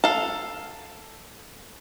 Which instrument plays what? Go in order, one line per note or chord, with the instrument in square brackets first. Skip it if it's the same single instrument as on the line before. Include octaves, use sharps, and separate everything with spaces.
[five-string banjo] A4 F5